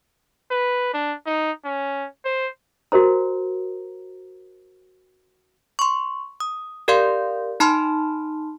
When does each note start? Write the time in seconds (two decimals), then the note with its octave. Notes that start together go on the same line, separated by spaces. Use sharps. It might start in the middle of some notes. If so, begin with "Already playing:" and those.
0.51 B4
0.94 D4
1.26 D#4
1.64 C#4
2.25 C5
2.92 F#4 A#4 C5 A#5
5.79 C6 C#6
6.40 D#6
6.88 G4 A#4 D5 F5 C6 G6
7.60 D#4 A5 B5 C6 F6